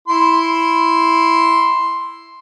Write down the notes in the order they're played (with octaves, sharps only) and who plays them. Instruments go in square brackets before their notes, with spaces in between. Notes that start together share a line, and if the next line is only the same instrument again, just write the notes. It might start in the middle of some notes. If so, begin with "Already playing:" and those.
[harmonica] E4 C6